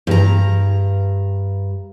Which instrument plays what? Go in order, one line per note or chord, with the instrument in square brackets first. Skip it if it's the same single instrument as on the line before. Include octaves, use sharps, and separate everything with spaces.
[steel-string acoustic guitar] G2 A#5